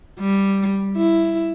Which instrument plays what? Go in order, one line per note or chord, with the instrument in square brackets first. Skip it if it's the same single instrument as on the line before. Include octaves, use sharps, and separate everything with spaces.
[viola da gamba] G3
E4